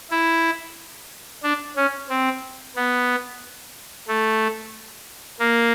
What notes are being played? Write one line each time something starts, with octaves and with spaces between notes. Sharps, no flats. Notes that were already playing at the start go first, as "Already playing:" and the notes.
E4
D4
C#4
C4
B3
A3
A#3